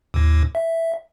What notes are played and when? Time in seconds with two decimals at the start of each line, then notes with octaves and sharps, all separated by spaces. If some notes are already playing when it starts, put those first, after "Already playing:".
0.14 D#2 A2
0.55 E5